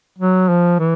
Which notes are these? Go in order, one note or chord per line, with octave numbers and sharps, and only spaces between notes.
F#3
F3
E3